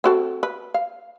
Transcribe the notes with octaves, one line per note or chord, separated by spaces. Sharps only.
C4 F#4 A4
B4
F5